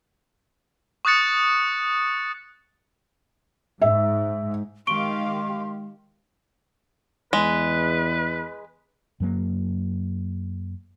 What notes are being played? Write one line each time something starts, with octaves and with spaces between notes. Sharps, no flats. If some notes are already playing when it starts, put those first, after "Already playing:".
C#6 D#6 F#6 A6 C#7
G#2 E5
D#3 G#3 G4 F5 C6 C#6 D7 G7
E2 G#3 B4
F#2 F#3 A#3